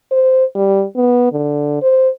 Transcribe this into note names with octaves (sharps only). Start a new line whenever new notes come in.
C5
G3
B3
D3
C5